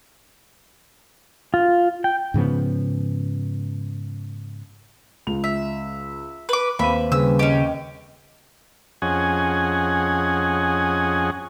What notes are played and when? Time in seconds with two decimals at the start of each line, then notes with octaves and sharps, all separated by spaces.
1.54 F4
2.04 G5
2.34 G#2 C#3 F3 B3
5.27 C#2 F7
5.44 E5
6.49 B4 D6
6.79 D#2 C4 B4 E5 F5 B5 D#7
7.12 C#3 G3 B4 E6
7.39 C#4 G4 D#5
9.02 F2 C#4 G#4 D#5 F#5 G#5